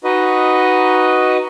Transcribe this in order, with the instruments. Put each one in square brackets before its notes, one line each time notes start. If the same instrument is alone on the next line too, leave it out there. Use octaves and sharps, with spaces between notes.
[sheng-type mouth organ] D#4 F#4 B4 D#5